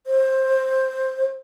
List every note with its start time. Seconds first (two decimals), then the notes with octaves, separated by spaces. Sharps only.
0.07 C5